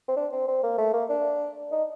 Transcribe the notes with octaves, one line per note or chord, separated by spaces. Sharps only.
C4
D4
C4
C4
A#3
A3
A#3
D4
D#4